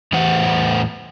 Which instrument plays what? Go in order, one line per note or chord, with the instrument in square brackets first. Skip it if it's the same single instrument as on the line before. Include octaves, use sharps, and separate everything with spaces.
[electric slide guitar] E2 A2 E3 C5 F#5